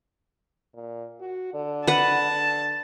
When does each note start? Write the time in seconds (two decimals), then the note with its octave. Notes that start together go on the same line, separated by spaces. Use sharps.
0.74 A#2
1.20 F#4
1.54 D3
1.87 B4 F#5 A5
2.31 D3